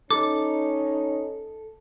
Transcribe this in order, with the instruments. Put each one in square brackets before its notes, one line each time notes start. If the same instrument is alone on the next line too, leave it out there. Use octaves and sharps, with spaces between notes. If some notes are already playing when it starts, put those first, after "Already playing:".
[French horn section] C#4 D#4 [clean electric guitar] A4 [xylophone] D6